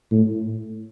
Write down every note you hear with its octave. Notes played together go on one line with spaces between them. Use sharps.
A2